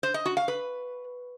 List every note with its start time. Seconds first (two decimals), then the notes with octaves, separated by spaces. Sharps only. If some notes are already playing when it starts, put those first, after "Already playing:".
0.03 C5
0.14 D#5
0.26 F#4
0.37 F5
0.48 B4